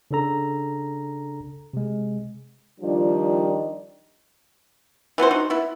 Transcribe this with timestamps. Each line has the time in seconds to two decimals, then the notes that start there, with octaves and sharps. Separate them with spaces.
0.11 C#3 D4 A4 A#5
1.74 C3 G#3
2.81 D#3 F3 G3 D4
5.18 E3 B3 F#4 C5
5.31 D4 D#4 F#4
5.50 B3 E4